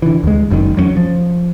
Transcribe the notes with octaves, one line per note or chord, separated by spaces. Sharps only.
D3 E3
D#2 G#3
F#1 F#2 A#2 D#3
E2 F#3 A3 C#4
F3